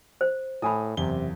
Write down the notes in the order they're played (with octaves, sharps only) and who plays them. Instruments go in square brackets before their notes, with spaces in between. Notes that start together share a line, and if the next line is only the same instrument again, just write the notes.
[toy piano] C5
[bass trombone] A2 [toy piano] E4 G#5 B5 [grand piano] D#6
[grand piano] F#1 E2 G7 [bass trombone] C3